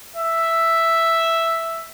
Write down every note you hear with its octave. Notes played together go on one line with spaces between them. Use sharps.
E5